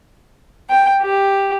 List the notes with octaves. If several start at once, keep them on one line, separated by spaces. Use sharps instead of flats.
G5
G4